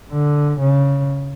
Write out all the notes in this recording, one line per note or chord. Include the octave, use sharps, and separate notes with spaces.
D3
C#3